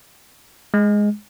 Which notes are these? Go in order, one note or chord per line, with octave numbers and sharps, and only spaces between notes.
G#3